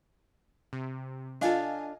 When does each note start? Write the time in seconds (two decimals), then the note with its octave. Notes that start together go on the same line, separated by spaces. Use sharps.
0.73 C3
1.41 D4 F4 A4 D#5 F5 G#5